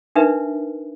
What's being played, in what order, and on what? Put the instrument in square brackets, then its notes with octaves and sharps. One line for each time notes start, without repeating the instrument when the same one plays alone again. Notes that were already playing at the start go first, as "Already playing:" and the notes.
[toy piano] D4 D#4 A#4 B4 E5